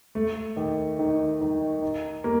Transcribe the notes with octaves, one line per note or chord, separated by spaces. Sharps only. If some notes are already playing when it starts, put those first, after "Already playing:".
A3
D#2
D#3
D#3
D#4
A#3